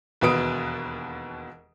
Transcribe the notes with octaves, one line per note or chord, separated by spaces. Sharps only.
E1 D#2 B2 B4 D#6 D7